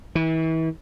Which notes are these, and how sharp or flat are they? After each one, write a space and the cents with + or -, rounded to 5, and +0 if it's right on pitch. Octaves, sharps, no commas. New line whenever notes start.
E3 -35